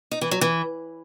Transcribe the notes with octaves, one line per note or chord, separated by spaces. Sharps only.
D#4
E3
F#3
E3